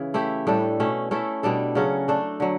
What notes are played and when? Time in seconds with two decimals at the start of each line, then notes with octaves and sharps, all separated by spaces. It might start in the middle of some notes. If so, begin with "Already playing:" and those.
Already playing: C#3 E3 C#4
0.14 A3 E4 G4
0.47 A2 G3 D4 A4
0.80 B2 A3 C#4
1.11 A3 C#4 E4 A4
1.43 B2 G3 D4 A4
1.75 C#3 F#3 C#4 F#4
2.08 A3 D4 A4
2.40 D3 F#3